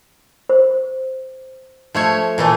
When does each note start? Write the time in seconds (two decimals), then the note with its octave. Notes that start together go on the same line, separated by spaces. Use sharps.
0.49 C5
1.94 F3 A3 C#5
2.38 A#2 E3 A3